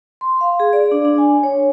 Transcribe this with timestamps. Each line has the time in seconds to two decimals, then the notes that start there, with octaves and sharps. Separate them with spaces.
0.21 C6
0.41 F5
0.60 G#4
0.73 D5
0.91 D4
1.05 D4
1.18 G#5
1.43 C#5